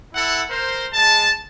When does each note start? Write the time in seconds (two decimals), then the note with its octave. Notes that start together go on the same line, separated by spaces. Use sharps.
0.15 E4 A4 F#5
0.50 A#4 C5
0.93 G#3 A5